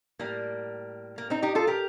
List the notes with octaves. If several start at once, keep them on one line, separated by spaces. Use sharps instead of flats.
A2 G3 A#3
A#3
C4 D#4
D#4 G4
F4 A4
G4 A#4